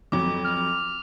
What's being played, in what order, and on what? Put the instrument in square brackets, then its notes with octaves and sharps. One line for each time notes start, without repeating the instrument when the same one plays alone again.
[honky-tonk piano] F2 F#3 [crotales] D6
[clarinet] F6